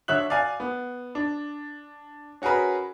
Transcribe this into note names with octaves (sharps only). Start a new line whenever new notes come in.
D3 C#5 E5 F#6 F#7
D5 F5 G#5
B3
D4
C#4 F#4 G#4 A#4 B4